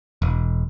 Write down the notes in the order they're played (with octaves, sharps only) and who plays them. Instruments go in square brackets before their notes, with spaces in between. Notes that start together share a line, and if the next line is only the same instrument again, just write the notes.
[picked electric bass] E1